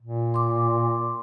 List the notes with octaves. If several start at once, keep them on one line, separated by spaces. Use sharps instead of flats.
A#2
C6 D6